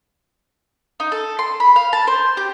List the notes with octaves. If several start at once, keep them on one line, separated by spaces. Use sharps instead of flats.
D#4
A4
C6
B5
F5
A5
C5
G4